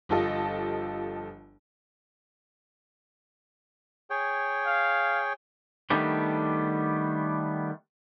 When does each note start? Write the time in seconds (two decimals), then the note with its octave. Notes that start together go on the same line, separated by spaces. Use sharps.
0.09 G1 F3 F4 G4 A4 D#5
4.10 G#4 C#5 G5
4.66 F5
5.90 D#3 G3 A3 B3 D4 G4